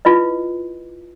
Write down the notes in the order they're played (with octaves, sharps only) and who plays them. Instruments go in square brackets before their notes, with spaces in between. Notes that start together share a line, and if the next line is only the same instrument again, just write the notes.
[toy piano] E4 F4 B4 D#5